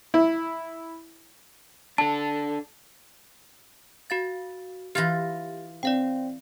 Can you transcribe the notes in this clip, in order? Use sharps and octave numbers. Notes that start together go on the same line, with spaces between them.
E4
D4 A4 A5
F#4 F5 A6
E3 F4 G4 A6 A#6
C4 D5 F5 G5